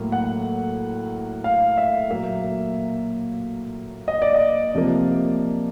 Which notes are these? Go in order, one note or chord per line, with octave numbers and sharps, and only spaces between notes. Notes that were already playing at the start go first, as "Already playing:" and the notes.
Already playing: A2 F#3 A#3
F#5
F5
E5
A#2 F#3 A#3 E5
D#5
D5
D#5
C3 F3 A#3